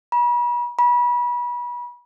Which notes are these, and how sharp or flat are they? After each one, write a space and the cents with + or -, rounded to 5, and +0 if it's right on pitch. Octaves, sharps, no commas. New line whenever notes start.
B5 -40
B5 -30